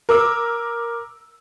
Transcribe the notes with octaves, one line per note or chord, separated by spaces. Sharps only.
A#4 D6 E6